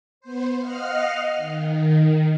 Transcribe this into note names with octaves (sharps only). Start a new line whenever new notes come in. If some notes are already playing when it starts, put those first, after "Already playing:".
B3 C5
D#5 F5 F#5 F6
D#3